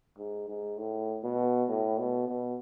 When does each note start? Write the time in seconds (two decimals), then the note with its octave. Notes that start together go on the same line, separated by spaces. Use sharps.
0.18 G#2
0.48 G#2
0.78 A2
1.23 B2
1.69 A2
1.99 B2
2.28 B2